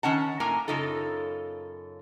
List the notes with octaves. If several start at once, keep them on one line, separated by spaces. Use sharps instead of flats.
D#3 C#4 F#5 A5
A2 A#3 A#4 G#5 A#5
F#2 C#3 D#4 F4 A4